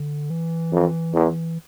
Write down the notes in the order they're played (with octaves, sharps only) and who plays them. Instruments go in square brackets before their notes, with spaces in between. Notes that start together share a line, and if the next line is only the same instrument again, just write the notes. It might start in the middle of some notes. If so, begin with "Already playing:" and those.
Already playing: [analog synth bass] D3
E3
[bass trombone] F2
E2